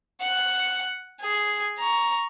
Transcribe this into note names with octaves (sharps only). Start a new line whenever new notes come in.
F#5
G#4
A#5 C#6